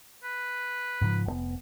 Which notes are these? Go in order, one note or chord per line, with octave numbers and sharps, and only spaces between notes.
B4
G#2 C#3 F3
F1 A#2 B3